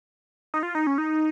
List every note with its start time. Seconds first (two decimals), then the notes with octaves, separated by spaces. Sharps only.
0.54 D#4
0.63 F4
0.75 D#4
0.87 C#4
0.98 D#4